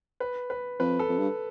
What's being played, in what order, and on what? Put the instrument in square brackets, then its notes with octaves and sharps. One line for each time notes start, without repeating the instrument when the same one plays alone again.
[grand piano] B4
B4
[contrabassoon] F2 [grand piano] B4
[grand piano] A4
[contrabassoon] F2
G2